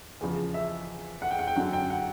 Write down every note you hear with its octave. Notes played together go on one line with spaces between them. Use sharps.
E2 C#3 F3
E5
F#5
G5
F#5
G5
F#2 D3 F#3 F#5
G5
F#5